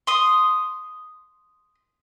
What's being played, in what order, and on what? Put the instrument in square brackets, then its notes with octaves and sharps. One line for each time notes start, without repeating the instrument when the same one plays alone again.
[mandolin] C6 D#6